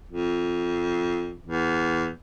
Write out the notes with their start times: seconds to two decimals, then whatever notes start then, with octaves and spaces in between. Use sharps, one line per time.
0.09 F2
1.47 E2